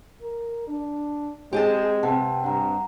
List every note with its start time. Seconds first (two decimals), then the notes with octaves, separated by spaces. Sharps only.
0.21 A#4
0.67 D4
1.53 G#3 C4 G4 G#4 A5
2.03 C3 B4 F#5 A5
2.44 G2 F#5 A#5